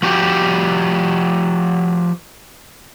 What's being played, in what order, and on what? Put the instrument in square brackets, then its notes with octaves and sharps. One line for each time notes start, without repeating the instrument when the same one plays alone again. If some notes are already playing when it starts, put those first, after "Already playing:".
[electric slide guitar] F3 F#4 G4